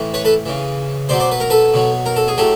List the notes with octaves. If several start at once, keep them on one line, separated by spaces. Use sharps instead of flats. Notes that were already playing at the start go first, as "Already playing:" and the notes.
Already playing: A2 E3
B4 C#5
A4 B4
C#3 E3
B2 F#3 C5 D5
C5 D5
B4
A#4
A4 B4
B2 F#3
A#4
A4
G#4
A2 F#3 G4 A4